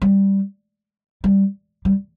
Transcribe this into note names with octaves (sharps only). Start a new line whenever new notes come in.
G3
G3
G3